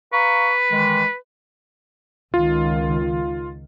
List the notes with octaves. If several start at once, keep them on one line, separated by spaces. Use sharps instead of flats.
B4 F5 A#5 C#6
D#3 E3 G#3
C#2 D#3 F4